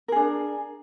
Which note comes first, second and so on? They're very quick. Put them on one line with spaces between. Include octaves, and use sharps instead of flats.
A#4 G#4 D4